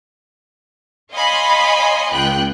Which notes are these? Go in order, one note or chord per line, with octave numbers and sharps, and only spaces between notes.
C#5 D#5 F5 G#5 B5 C6
C#2 F4 G5 F#6